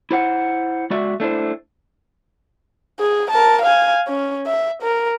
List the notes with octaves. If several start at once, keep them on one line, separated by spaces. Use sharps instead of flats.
E4 C5 F#5
G#3 F#4 D5 E5
A3 D4 E4 C5
G#4
A#4 A5
F5 G#5
C#4
E5
A#4